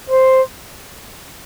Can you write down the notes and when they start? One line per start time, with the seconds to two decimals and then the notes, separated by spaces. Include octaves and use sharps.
0.10 C5